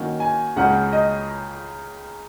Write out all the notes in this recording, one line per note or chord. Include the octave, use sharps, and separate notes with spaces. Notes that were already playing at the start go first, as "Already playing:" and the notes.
Already playing: D#3 A#3 C#4 F#4
G#5
C#2 C#3 G#3 C#4 F#5
D#5